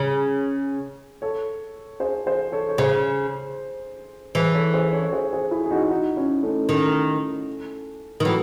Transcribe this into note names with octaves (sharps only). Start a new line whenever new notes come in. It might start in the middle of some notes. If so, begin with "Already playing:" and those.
Already playing: C#3 G#4
A4 C#5
G#4 C5
G#4 C5
A4 C#5
C#5
C#3 G#4 C5
E3 G#4 C5
A4 C#5
G#4 C5
A4 C#5
C#5
G#4 C5
G#4 C5
E4 G#4
G#4
D#4 F#4
D#4 F#4
C#4 E4
A3 C#4
D#3 A3 C#4
D#3
E3 F#3 A3